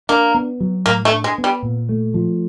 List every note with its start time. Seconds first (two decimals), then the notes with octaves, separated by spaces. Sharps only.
0.09 A#3 D4
0.34 B3
0.60 F#3
0.86 A2 A#3
1.05 A3
1.11 D4
1.24 G#3
1.38 B3
1.44 G3
1.63 A#2
1.89 A3
2.14 F3